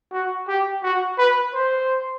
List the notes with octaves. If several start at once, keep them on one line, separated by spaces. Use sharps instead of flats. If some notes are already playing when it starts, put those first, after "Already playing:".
F#4
G4
F#4
B4
C5